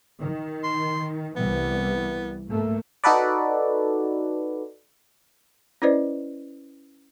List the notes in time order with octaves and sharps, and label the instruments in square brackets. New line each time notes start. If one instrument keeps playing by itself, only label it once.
[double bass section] D#3
[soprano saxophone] C6
[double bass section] C2 E3 G3 [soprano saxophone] B3
[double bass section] G#2 A3 A#3
[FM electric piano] D#4 F#4 A4 B4 D5
[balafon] C#4 E4 B4 C5 D5 D#5